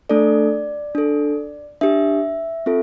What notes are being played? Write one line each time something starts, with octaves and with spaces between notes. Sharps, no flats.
A3 D4 A4 D5
D4 A4
D4 G4 E5
C4 F4 A4